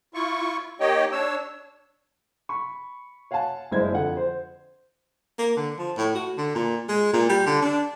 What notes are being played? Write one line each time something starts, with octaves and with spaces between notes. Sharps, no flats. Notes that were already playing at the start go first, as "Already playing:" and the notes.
E4 F4 C#6
A#3 D#4 G4 C#5 D#5 G5
D4 C#5 E6
B5 C#6
C#5 F5 F#5 G#5 A5
F#1 G2 G#3 E4 C5 G#6
F2 D3 F#5
C5
A#3
D3
F3
A2
F#4
D3
A#2
G#3
A#2
G3
D3
D4